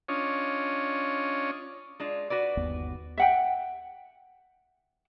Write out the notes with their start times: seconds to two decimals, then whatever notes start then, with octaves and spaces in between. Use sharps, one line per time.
0.08 C#4 D4 F4 C#5 D#5
2.00 G#3 D4 F4
2.30 F#4 B4 D5
2.57 G1 D#2 B3
3.17 E5 F#5 G5